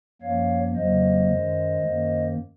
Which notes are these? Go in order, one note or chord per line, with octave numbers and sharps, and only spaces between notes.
F#2 F3 A#3 C#5 F5
F2 C#3 F#3 A#3 C5 D#5
F#2 D#3 G#3
F#2 D#3 A#3